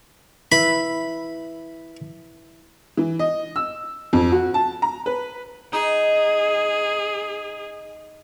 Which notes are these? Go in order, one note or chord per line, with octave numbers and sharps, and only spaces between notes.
E4 B4 E5 B5
E3
D#5
E6
F2
F#4
A5
A#5
B4
D#4 G#4